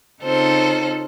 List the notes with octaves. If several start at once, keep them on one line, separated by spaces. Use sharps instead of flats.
C#3 C4 D#4 F4 A4 C5